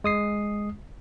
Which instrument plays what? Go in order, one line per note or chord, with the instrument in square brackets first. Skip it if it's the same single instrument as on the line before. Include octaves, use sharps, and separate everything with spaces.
[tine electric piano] G#3 D#6 C7